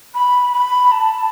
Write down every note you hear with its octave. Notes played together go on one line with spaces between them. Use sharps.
B5
B5
A5